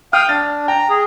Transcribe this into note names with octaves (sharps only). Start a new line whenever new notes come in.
F5 G5 D#6 F6
D4 A6
G5 A#5
G#4